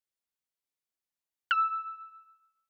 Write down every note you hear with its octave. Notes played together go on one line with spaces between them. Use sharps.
E6